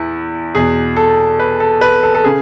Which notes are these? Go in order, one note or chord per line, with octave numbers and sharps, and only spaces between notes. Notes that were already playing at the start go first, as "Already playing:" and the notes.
Already playing: E2 E4
E2 B2 G#4
A4
B4
A4
B4
A4
A4
C#3 G#4